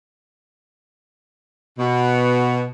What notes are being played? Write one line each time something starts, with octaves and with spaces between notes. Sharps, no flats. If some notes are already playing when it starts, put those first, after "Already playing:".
B2